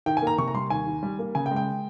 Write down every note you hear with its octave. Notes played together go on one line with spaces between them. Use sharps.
D#3 G5
G#5
A#3 A#5
C3 C#6
A#5
G3 C6
D#2 G#5
D#3
G3
A#3
C#3 G#5
G5
G#3
G5